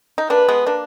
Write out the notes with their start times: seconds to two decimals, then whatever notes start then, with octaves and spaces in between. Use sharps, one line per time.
0.18 D#4
0.29 A#3 D4 B4
0.49 G#3 B3
0.66 A#3 D4